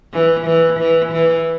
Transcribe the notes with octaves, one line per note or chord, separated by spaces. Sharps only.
E3
E3
E3
E3